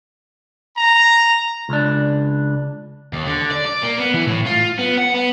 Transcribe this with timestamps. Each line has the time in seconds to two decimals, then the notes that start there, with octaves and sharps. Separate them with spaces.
0.76 A#5
1.69 C#2 D4
3.13 D#2
3.26 D3
3.51 D5
3.66 D5
3.83 A#3
3.98 B3
4.14 E3
4.28 A2
4.46 F4
4.79 B3
4.97 F#5
5.14 B3